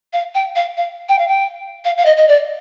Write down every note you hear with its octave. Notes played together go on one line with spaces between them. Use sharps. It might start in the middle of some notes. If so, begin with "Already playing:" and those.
F5
G5
F5
F5
G5
F5
G5
F5
F5
D#5
D#5
D5